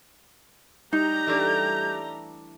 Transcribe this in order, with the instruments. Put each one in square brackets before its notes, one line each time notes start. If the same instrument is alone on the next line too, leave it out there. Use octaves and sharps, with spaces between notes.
[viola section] G3 G4 A#5 [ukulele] D#4 [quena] G6
[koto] E3 A3 D4